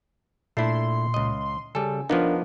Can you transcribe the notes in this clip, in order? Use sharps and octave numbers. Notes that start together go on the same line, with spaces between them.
A#2 A3 D4 E4 C6
C#2 D#5
C#3 G3 A4 G#5
F3 B3 D4 D#4 A#4 F5